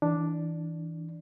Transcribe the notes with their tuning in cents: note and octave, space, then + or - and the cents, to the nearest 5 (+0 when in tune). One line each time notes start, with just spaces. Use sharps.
E3 -20 D4 +0